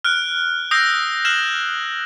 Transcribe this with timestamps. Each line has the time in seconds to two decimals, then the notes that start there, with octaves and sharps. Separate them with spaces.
0.05 F6 F#6 D7
0.71 D#6 E6 G6 A#6 C7 D7
1.25 F6 F#6 G#6 C7 E7 F#7